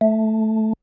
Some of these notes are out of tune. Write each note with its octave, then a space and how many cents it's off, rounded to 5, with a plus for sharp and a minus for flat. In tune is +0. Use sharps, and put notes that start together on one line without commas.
A3 -5